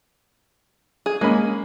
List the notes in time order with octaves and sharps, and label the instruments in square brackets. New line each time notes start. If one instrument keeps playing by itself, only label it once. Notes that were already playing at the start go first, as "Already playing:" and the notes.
[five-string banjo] G#4
[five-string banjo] G#3 [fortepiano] A#3 C#4 B5